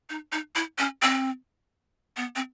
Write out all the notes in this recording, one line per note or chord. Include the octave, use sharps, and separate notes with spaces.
D#4
D#4
E4
C#4
C4
B3
C4